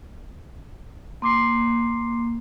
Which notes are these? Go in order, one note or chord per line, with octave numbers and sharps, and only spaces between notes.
A#3 C6 D6 C7